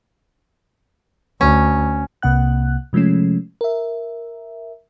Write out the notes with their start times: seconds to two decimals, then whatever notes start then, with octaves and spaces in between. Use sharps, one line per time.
1.41 D2 C#4
2.22 C2 C3 A#3 F#5 F#6
2.93 C3 F3 G#3 A3 C#4
3.61 A#4 E5